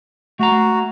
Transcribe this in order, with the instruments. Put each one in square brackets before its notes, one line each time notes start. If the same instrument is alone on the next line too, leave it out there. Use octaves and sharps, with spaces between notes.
[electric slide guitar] A3 A#5 [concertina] F#4